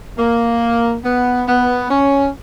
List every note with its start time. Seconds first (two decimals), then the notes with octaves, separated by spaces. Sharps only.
0.18 A#3
1.04 B3
1.48 B3
1.90 C#4